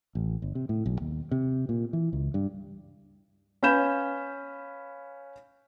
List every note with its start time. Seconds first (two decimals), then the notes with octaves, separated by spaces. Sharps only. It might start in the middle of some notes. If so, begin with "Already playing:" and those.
0.15 A1
0.42 G1
0.55 C3
0.69 A2
0.86 B1
1.01 D#2
1.31 C3
1.69 A#2
1.93 E3
2.13 C#2
2.34 G2
3.63 C#4 B4 F5 B5 G6 E7